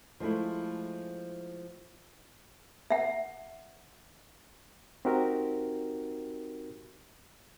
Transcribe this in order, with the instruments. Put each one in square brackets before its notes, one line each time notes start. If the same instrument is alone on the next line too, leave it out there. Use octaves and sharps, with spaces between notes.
[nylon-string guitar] F3 G#3 A3 E4
[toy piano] E5 F#5
[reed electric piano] C4 D#4 F#4 G4 A#4